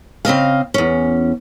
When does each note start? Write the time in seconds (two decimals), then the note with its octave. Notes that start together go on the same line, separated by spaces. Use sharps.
0.25 C#3 C4 D#5 F5
0.74 E2 C#4